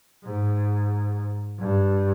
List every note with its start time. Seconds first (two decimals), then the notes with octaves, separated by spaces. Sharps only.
0.24 G#2
1.59 G2